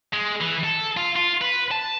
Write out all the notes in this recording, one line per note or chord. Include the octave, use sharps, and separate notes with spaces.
G#3
E3
A4
F4
F4
B4
A5